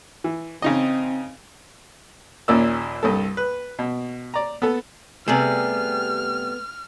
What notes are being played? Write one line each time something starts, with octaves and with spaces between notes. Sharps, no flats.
E3
C#3 C4 D#4 D#5
A#1 D#2 A#2 C#4 D5 E6
C2 G2 A4
B4
B2
D5 A#5
B3 A4
C3 G3 A3 B3 G#4 F6